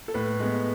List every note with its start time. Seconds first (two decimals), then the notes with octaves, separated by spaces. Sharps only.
0.08 A4
0.14 A2 B4
0.40 G#3 B3